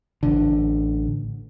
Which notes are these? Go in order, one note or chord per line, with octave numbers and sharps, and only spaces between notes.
A1 D3